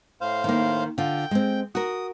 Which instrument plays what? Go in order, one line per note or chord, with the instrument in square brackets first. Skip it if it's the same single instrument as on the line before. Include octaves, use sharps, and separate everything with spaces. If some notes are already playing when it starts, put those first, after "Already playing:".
[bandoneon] A2 C5 F5
[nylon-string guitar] D#3 A#3
[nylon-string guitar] D3 F4 [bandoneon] G5
[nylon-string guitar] G#3 C4
[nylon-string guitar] F#4 A#4 [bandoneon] D#6